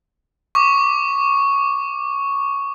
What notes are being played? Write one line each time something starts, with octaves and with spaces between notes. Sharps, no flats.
C#6 D6